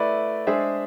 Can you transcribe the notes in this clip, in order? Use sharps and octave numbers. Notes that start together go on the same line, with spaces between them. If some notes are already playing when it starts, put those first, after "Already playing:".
Already playing: A3 E4 B4 D5
G#3 D4 G#4 C5 E5